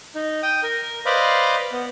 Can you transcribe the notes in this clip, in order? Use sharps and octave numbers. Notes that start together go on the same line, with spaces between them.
D#4
G5 D#6
A#4
B4 C5 D5 D#5 F5 B5
B3